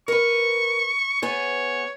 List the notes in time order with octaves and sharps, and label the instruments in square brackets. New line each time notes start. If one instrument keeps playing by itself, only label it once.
[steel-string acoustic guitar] A#4 B4 [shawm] C#6
[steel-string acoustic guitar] B3 G#4 [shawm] C#5